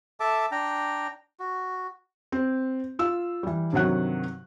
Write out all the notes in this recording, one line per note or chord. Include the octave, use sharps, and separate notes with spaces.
A4 E5 A5 D6
D4 G5 A#5
F#4
C4
F4 E6
E3 G3
G2 C3 D#3 F#3 F#5 F#6